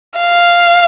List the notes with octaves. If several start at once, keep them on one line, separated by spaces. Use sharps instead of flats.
F5